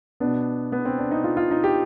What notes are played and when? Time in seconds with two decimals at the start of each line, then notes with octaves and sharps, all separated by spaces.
0.20 B2 B3 D4
0.72 B3
0.85 C4
0.98 D4
1.11 D#4
1.24 F4
1.37 F4
1.51 D#4
1.64 G4